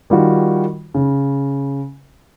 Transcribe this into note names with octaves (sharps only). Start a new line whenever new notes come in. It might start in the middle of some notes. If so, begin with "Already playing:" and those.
D#3 G3 F4 F#4
C#3